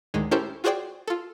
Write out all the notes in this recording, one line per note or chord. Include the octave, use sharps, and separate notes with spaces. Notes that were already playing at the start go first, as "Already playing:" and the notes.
D2 A2 D#3 G#3
C#4 E4 G4 A4 A#4 C5
F4 F#4 G#4 C5 D5 G5
F4 A4